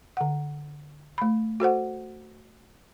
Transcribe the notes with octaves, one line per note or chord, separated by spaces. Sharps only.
D3 F#5
A3 B5
F#4 A4 C5 F#5